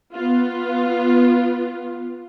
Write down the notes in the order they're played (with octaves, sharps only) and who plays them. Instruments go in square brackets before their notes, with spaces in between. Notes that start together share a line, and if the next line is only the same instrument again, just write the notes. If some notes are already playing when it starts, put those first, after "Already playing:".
[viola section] B3 F4